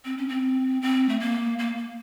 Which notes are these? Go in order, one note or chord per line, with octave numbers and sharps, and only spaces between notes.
C4
C#4
C4
C4
A3
A#3
A#3
A#3